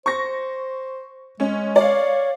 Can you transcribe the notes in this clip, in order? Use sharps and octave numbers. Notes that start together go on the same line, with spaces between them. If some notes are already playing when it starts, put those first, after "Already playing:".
C5 C#6 A#6
G#3 C#4
C#5 D5 F5